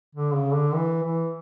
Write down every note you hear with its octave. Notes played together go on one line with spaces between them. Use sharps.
D3
C#3
D3
E3
E3